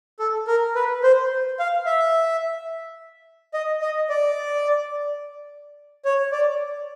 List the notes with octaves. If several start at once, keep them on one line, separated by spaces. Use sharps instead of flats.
A4
A#4
B4
C5
F5
E5
D#5
D#5
D5
C#5
D5